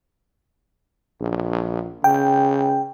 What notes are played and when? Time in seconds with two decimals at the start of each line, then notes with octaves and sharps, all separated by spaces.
1.21 A#1
2.04 C#3 G5